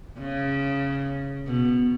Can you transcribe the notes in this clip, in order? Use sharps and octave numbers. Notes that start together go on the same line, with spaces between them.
C#3
B2